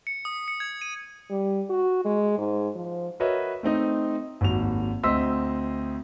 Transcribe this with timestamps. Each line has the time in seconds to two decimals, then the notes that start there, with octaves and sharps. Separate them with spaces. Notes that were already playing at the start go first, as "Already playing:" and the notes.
0.07 C#7
0.25 D#6
0.48 C#7
0.60 G#6
0.82 D#7
1.30 G3
1.70 F#4
2.05 G#3
2.38 G#2
2.75 F3
3.20 F#4 A#4 B4 C#5 D#5 E5
3.63 A3 C4 D#4 D#5
4.41 G#1 D#2 F#4 F7
5.03 D2 C4 D#5 C6 E6 B6